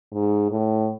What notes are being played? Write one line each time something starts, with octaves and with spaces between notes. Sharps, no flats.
G#2
A2